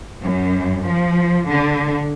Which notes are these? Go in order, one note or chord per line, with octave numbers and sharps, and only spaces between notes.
F#2
F3
D3